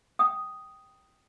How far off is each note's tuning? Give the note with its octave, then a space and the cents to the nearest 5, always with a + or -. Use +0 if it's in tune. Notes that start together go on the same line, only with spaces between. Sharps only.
G5 -10 D#6 +0